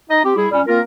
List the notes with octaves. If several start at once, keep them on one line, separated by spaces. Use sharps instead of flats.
D#4 D#5
C4 G4
G3 E4 G#4
A#2 G3 C#4
A#3 C4 F4 A#4